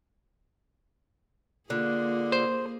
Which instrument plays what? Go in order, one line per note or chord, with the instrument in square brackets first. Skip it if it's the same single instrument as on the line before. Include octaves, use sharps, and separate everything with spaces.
[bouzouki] D3 [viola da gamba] A#3 G#4 [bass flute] F4
[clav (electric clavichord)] C5